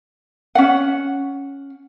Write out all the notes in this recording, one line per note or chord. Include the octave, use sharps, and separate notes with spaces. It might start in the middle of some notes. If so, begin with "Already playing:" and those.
C#4 F#5